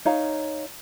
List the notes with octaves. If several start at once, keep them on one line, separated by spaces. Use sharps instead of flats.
D#4 C#5 F5 A#5